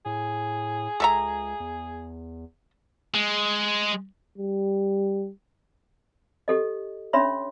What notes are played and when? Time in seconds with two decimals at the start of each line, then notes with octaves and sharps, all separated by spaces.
0.06 A2 G#4
1.00 C#2 A4 E5 A#5
1.60 E2
3.14 G#3
4.38 G3
6.48 G4 A4 D#5
7.13 C#4 D4 C#5 E5 B5 C6